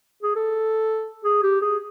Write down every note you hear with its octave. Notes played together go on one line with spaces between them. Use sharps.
G#4
A4
G#4
G4
G#4